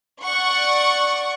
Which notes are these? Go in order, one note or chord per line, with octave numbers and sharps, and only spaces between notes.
D5 F#5 C#6